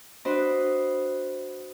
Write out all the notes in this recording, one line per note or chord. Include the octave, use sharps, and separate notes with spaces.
D4 F#4 B4 C5 D#5